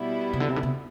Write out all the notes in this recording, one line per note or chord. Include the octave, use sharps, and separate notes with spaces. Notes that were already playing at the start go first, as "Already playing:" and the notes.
Already playing: B2 G3 B3 E4
C3
D3
C3
D3
C3